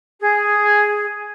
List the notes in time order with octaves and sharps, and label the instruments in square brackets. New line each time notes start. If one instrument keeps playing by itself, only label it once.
[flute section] G#4